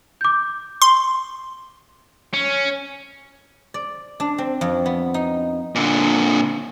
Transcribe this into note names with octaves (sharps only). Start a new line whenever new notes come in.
D6 G6
C6
C#4
D5
D4
C4
F2
B3
D#4
A#2 D3